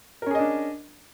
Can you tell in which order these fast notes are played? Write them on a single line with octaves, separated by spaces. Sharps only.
A#4 C#4 G#4 D#5 D4